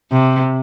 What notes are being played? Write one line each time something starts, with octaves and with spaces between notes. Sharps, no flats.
C3